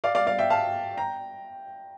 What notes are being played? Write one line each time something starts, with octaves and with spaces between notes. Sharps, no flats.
D5 F5
D5 F5
D5 F5
E5 G5
F5 A5
G5 A#5